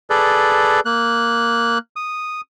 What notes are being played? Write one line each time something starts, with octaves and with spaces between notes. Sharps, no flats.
G#4 A4 B4 D5
A#3 F#6
D#6